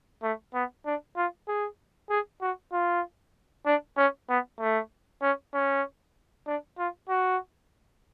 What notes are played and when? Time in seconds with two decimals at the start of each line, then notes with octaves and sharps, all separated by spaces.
0.23 A3
0.54 B3
0.86 D4
1.17 F4
1.48 G#4
2.10 G#4
2.41 F#4
2.72 F4
3.66 D4
3.97 C#4
4.29 B3
4.60 A3
5.22 C#4
5.54 C#4
6.47 D4
6.78 F4
7.09 F#4